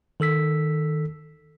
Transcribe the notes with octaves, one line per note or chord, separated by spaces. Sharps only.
D#3 A4 E6 B6